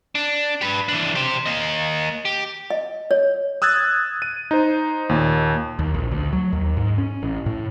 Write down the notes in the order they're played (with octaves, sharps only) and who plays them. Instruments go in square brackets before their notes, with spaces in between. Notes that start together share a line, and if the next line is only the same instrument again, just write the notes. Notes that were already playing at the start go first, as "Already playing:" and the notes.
[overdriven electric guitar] D4
G4 B4
E3 D4
G4 C5
A#3 D#5
G4
[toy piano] D#5
C#5
[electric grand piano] D#6 E6 F#6 G#6 A6
D#7
D#4 C5
D#2 A#2
[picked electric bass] D#2
A#1
D2
F#3
D#2
G#2
C#4
A1
A2